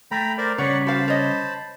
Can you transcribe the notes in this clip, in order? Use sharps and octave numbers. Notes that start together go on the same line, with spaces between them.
A3 G5 A#5 B5
A#4 C5 D5
C#3 G3 C#5 D5 F#5 C#6
F#4 C5 F5 A5 B5
C#5 D#5